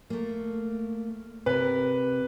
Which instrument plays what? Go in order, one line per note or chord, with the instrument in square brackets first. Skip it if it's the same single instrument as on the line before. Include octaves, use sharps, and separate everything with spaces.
[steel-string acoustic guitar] A3 A#3
[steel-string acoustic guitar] C3 A#4 [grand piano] B4